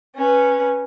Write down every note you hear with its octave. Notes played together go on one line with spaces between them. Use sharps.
C#4 B4